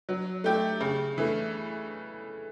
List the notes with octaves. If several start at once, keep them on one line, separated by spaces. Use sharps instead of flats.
F#3
A3 E4 G4
C#3
E3 A3